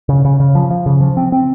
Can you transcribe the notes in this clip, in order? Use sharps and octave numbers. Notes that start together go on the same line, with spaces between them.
C#3
C#3
C#3
F3
F3
C#3
F3
C4
C4